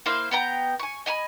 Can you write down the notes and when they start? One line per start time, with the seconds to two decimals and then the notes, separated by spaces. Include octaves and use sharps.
0.06 A#3 E4 C5 F5
0.31 B3 G5 A#5
0.79 G#5 C#6
1.06 D#5 G#5 A#5 B5